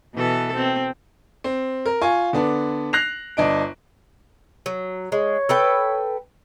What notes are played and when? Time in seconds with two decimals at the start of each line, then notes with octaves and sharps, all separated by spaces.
0.15 B2 E3 A4
0.55 C4
1.44 C4
1.86 A#4
2.01 F4 G#5 C#6
2.33 D3 B3 D4
2.93 F#6 A#6 C7 F7
3.37 G1 D4 D#5 D7
4.66 F#3
5.12 G#3 C#5
5.49 A4 B4 G5